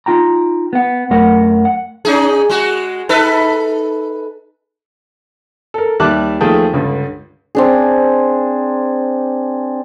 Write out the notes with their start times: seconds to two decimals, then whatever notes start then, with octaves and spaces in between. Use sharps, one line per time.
0.06 D#4 F4 G5 A#5
0.73 B3 F#5
1.10 F#2 F#3 A3 A#4 F#5
1.65 F#5
2.05 C#4 D#4 G#4
2.49 G#3 F#4
3.09 D#4 A4 B4
5.74 A4 A#4
6.00 D#2 G3 E5 A5 D6 F#6
6.40 D#2 F3 A3 G#4 G5 A5
6.73 C#2 G2 D3
7.55 C4 D4 G#4